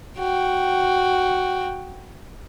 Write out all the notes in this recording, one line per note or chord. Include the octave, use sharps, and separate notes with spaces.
F#4 G5